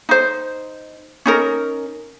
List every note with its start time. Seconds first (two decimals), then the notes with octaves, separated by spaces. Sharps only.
0.09 D#4 C5
1.26 C#4 D#4 A#4